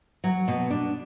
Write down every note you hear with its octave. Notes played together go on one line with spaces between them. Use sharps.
F#3
B2
D4